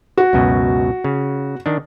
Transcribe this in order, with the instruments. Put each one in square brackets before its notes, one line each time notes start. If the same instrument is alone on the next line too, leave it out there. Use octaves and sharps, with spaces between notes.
[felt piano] F#4
[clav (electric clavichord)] C#2 F#2 B2
C#3
D#3 D4